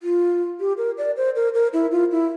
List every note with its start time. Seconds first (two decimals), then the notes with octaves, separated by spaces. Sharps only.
0.03 F4
0.60 G4
0.78 A#4
0.98 D5
1.17 C5
1.36 A#4
1.54 A#4
1.73 E4
1.91 F4
2.11 E4